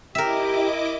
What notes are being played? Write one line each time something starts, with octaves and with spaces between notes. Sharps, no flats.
E4 G4 A#4 D#5 E5 D6